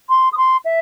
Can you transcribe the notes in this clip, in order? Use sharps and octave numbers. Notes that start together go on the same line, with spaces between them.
C6
D#6
C6
E5